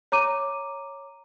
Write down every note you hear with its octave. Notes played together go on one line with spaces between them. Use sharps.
C#5 A#5 D6 D#7